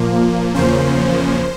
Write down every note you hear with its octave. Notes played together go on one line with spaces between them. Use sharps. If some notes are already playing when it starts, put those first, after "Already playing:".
Already playing: A#2 F3 A#3
E2 C#3 F3 A#3 C#4 C5